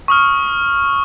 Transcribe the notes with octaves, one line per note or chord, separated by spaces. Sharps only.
C#6 D#6 F6